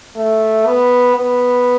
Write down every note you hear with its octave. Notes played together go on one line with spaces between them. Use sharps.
A3
B3
B3